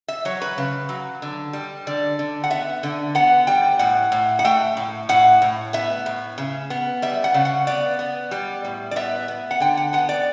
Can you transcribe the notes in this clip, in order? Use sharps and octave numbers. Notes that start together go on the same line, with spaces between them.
E5
F#3 C#5
B4
C#3
F#3
D3
G3
D3 D5
D3
F#5
B3 E5
D3
B3 F#5
G3 G5
A2 F#5
A2
F#5
A3 G5
A2
A2 F#5
A2
B3 E5
A2
C#3
B3
G3 E5
F#5
C#3
F#5
B3 D5
B3
G3
A2
D5
B3 E5
B3
F#5
D3 G5
F#5
B3 F#5
D5